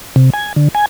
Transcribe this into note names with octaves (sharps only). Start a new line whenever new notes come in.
C3
G#5
D3
G#5